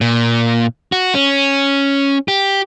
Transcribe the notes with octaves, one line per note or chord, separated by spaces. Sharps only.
A#2
F#4
C#4
G4